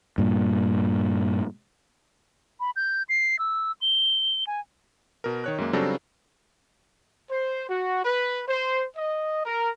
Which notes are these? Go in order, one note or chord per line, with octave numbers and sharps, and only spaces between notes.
G2 A#2
B5
G6
C7
E6
G7
G#5
B2 A#4
D#3 C#5 F#6
F#2 G#3 A#3
C#3 F#3 G3 C4 D4 A4
C5
F#4
B4
C5
D#5
A#4